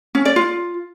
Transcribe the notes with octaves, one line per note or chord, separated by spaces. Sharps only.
C#4
D5
F4